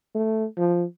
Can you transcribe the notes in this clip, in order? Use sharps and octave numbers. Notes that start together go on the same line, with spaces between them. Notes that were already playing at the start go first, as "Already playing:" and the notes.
A3
F3